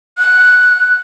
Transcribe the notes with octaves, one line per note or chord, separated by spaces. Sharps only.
F#6